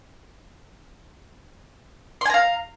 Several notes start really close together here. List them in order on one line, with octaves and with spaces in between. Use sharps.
C6 G#5 A#5 F5